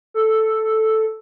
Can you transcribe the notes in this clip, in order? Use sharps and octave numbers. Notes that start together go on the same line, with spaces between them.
A4